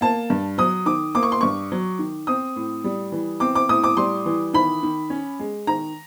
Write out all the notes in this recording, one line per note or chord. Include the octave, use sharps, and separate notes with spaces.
A#3 A5
G2
F#3 D#6
D#3 D6
A#3 D6
C#6
C6
G2 C#6
F#3
D#3
C4 D#6
A2
G3
E3
C4 D6
D6
A2 D#6
D6
G3 C6
E3
D#3 B5
D#3
C#4
G#3
D#3 A#5